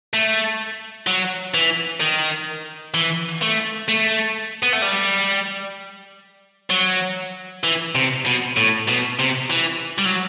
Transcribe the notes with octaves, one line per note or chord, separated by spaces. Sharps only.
A3
F#3
E3
D#3
E3
A3
A3
B3
A3
G3
F#3
E3
C3
B2
A2
B2
C3
E3
G3
F#3